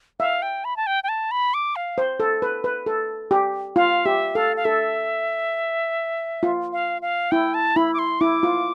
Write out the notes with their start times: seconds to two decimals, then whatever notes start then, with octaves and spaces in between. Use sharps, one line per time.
0.20 E5 F5
0.42 G5
0.65 B5
0.77 A5
0.87 G5
1.04 G5
1.09 A5
1.31 B5
1.54 D6
1.76 F5
1.98 C5
2.20 A4
2.42 B4
2.64 B4
2.86 A4
3.31 G4
3.76 F4 F5
4.06 G4 E5
4.35 A4 F5
4.57 F5
4.65 A4 E5
6.43 F4
6.73 F5
7.02 F5
7.31 E4 G5
7.54 A5
7.76 E4 B5
7.94 D6
7.99 C6
8.21 E4 D6
8.43 F4